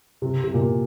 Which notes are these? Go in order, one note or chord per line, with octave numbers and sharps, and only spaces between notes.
C3
C3
A#2